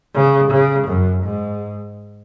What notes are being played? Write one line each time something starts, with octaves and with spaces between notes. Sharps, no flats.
C#3
C#3
F#2
G#2